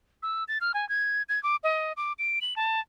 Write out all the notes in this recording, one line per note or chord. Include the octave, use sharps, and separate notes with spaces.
E6
A6
F6
G#5
G#6
G#6
D6
D#5
D6
D7
F#7
A5